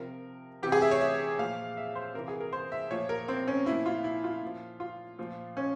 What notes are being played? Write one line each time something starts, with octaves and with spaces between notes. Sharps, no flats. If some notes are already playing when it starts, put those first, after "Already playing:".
Already playing: C3 F3 A#4
C3 E3 G4
G#4
E5
C#5
E5
A#2 F3 F5
E5
C5
C3 E3 A#4
G#4
A#4
C5
E5
A#2 F3 C#5
A#4
C4
C#4
A#2 F3 E4
F4
E4
F4
A#2 F3
F4
A#2 F3
C#4